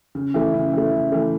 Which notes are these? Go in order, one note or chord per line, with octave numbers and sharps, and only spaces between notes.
C#3
E3 A3
C#3
E3 A3
C#3
E3 A3